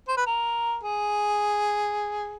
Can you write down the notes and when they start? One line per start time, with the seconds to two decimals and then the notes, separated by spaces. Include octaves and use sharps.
0.09 C5
0.17 B4
0.27 A#4
0.83 G#4